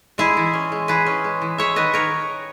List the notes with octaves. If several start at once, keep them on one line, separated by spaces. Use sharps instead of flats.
G#3 E4 G#4
E3
C#4
G#3
E3 G#4 B4
C#4
G#3
E3
G#3 C#5 E5
D#3 B4 D#5
D#3 A#4 C#5